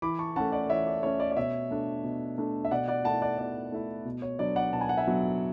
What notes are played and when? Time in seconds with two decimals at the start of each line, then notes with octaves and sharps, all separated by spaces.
0.02 E3 B5 D6
0.19 A5 C#6
0.36 A3 C#4 F#5 A5
0.52 D5 F#5
0.69 E3 C#5 E5
0.87 D5
1.03 A3 C#4 C#5
1.20 D5
1.31 D5
1.37 B2 C#5 E5
1.71 A3 D4
2.04 B2
2.38 A3 D4
2.65 E5
2.71 B2 D5 F#5
2.88 D5 F#5
3.04 A3 E4 F#5 A5
3.22 D5 F#5
3.38 B2 D5
3.72 A3 E4
4.05 B2
4.22 C#5
4.39 F#3 B3 D4 D5
4.56 D5 F#5
4.73 B2 A5
4.81 G#5
4.89 F#5
4.97 E5 G#5
5.06 F#3 B3 D4